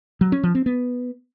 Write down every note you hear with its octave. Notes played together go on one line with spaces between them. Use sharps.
F#3
C#4
F3
C4
B3